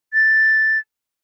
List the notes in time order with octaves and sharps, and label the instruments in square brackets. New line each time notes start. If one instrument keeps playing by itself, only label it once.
[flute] A6